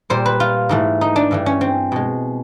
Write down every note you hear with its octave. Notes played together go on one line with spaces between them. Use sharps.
A#2 G3 C5
B4
F4
G#2 E3 A3
D#4
D4
G2 E3 A3
C#4
C4
B2 G#3